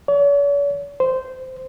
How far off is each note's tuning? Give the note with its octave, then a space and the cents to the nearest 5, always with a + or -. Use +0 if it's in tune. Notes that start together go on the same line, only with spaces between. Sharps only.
C#5 +45
C5 -15